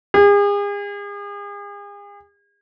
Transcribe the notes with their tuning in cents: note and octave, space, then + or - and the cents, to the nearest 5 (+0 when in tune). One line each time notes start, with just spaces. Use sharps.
G#4 -40